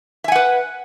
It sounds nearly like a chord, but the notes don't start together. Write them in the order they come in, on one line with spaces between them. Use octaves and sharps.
E5 G#5 F#5 B4